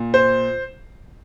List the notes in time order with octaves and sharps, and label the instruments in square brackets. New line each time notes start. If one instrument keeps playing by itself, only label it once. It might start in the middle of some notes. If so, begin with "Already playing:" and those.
Already playing: [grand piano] A#2
C5